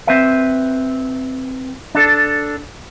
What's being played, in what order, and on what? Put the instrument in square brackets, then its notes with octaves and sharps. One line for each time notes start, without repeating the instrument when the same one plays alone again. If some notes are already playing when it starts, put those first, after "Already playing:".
[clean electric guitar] C4 B4 E5
D4 A4